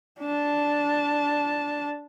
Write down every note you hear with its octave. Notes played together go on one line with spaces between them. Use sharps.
D4 A5